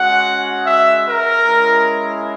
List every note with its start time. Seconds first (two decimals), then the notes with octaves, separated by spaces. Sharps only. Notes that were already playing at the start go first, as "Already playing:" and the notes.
Already playing: G#3 C#4 F#4 F#5
0.66 E5
1.06 A#4
1.45 G#3 C#4 E4